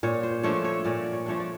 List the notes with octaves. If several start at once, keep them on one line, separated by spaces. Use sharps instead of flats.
A#2 C#5
C5
F3 A3 D4 C#5
C#5
A#2 D5
C#5
F3 A3 D4 C#5
D5